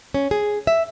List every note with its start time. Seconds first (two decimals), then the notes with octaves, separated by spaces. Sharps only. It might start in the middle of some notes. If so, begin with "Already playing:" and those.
0.14 C#4
0.31 G#4
0.67 E5